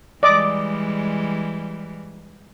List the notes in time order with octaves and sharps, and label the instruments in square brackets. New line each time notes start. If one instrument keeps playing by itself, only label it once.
[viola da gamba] E3 G3 G#3 [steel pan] D5 D#5 D6